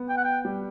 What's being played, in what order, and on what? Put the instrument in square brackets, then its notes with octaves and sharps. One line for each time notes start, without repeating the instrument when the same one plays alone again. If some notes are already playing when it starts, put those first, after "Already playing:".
Already playing: [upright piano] B3
[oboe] G5
F#5
G5
[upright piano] G3